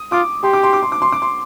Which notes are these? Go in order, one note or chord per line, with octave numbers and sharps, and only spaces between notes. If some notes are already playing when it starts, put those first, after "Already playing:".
Already playing: D#6
F4 D6
G4 C6
D6
C6
D6
C6
D6
C6
D6
C6